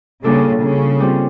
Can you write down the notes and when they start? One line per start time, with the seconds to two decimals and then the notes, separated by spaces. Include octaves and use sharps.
0.24 C#3 G3 A#3 D4 F4 A4
0.62 C#3
1.00 G3 C4 F4